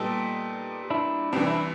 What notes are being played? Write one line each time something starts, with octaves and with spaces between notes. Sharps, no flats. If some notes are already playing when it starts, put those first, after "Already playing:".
Already playing: A#2 G3 B3 D#4 G4 A4
D4 E4
C2 C3 E3 C4 D4
D4 E4